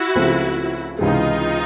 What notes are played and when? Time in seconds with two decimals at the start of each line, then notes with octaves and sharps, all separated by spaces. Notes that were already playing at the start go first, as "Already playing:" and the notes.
Already playing: E4 F#4
0.15 C#2 C#3 F3 A3 C4
0.98 C#2 C3 E3 G#3 D#4 F4